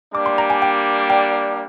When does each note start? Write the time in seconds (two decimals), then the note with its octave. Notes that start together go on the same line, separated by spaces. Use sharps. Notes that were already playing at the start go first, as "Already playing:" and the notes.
0.14 G3 A#3 D4 D6
0.26 C6
0.38 A#5
0.50 G#5
0.62 G5
1.10 G5